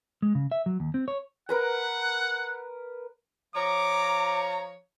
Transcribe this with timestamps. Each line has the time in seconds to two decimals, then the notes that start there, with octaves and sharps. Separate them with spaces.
0.22 G#3
0.35 C#3
0.52 E5
0.66 F#3
0.80 D#2
0.94 C4
1.08 C#5
1.49 A#4 B4 F#5 A#5
3.56 F3 C#5 A#5 D6